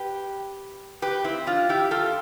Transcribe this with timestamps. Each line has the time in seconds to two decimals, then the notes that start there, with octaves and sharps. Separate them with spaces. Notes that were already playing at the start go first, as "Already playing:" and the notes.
Already playing: G4 B4
1.02 G4 B4
1.24 C4 E4
1.47 D4 F4
1.69 E4 G4
1.91 F4 A4